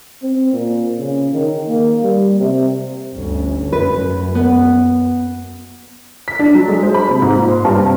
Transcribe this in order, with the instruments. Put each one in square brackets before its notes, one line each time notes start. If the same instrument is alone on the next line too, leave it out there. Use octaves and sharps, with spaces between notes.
[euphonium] C4
A#2
C#3
D#3
A#3
G3
C3
[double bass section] G1 D2 C#4
[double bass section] F#2 [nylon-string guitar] B4
[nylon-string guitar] B3
[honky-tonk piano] B6
D4
F#3
G#3
C5
B5
C3
G#2
A#2
C6
G2
C3